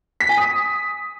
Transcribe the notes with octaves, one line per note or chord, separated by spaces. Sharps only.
B6
G#5
D#6